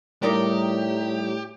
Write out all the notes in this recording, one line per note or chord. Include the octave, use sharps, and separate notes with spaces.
A2 G3 D#4 G4 A#4 D5